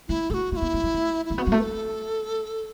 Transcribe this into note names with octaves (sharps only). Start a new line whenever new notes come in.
A3 E4
A3 A4
F#4
A3 F#4
E4
B3
A3
F#3
A3
E4
A3
B3 F#4
F#3
A3
B4
A4